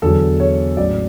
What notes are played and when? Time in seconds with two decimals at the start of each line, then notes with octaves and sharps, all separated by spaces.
0.02 E2 D3 F#3 A4
0.40 C#5
0.77 A1 G#2 F#3 D5